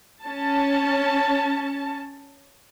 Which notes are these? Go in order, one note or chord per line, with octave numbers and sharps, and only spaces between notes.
C#4 A5